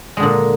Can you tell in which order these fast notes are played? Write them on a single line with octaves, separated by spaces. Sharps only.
G#3 D3 A#2